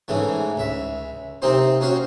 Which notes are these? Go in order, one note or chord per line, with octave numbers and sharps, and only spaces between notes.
G#2 C#3 E3 A3
C#2 E5
C3 A#3 C4 D#4 C5
C#4 F#4 C5 F5